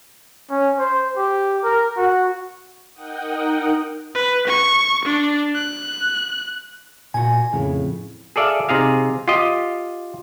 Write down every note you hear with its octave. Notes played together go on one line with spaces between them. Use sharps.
C#4
C5
G4
A#4
F#4
D#4 A#4 F#5 G5 D#6
B4
C#6
D4
F#6
A#2 F#4 G#5
F2 A2 C#3
G#4 A4 D5 E5 F5
C3 D#4 G#4 F5
F4 G4 D#5